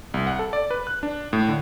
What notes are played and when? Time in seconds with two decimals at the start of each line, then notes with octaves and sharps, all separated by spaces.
0.14 C2
0.27 F#5
0.39 A4
0.53 D5
0.71 B4
0.87 F#6
1.03 D4
1.33 A2
1.48 D3